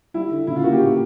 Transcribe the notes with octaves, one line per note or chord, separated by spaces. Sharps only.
G3 E4
D3
C#3 E4
F4
A#3 F#4
G4
A2